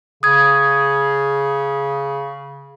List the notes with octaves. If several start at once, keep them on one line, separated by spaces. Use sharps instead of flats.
C#3 D#6 G#6